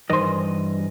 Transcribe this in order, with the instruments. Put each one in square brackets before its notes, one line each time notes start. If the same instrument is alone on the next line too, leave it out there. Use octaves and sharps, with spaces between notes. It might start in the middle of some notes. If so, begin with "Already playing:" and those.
[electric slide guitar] G2 E3 D#5 [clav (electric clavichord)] D#3 C5